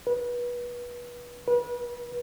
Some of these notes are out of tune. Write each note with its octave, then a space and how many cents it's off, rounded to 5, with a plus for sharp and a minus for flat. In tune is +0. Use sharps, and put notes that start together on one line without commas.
B4 -25
B4 -30